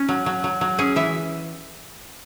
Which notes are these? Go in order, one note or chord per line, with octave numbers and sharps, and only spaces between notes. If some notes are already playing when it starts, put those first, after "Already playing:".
Already playing: C#4
F#3
F#3
F#3
F#3
C#4 G#4
E3 E5